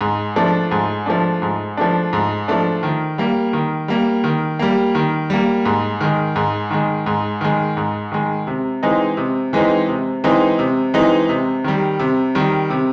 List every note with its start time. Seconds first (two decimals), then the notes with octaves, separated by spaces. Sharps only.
0.01 G#2
0.36 F3 A3 D4
0.71 G#2
1.06 F3 A3 D4
1.42 G#2
1.77 F3 A3 D4
2.13 G#2
2.48 F3 A3 D4
2.83 D#3
3.18 G3 A#3
3.53 D#3
3.88 G3 A#3
4.24 D#3
4.59 G3 A#3
4.95 D#3
5.30 G3 A#3
5.65 G#2
6.01 D#3 G#3
6.36 G#2
6.70 D#3 G#3
7.06 G#2
7.41 D#3 G#3
7.77 G#2
8.12 D#3 G#3
8.47 C3
8.83 E3 G#3 C4 D#4
9.17 C3
9.53 E3 G#3 C4 D#4
9.88 C3
10.24 E3 G#3 C4 D#4
10.59 C3
10.94 E3 G#3 C4 D#4
11.29 C3
11.64 D#3 G3
12.00 C3
12.35 D#3 G3
12.70 C3